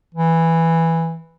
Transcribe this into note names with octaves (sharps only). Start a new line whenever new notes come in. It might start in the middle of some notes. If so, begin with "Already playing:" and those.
E3